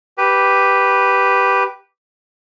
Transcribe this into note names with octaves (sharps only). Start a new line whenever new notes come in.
G4 B4